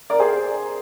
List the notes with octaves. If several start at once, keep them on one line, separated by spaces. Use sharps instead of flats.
A#4 D5
G#4 C5